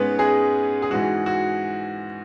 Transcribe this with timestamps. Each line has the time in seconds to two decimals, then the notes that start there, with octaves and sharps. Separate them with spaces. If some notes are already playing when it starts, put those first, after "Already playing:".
Already playing: G#2 G#3 B3 C#4 B4
0.19 G#3 G#4
0.82 G#4
0.90 G#2 E3 G#3 F#4
1.26 F#4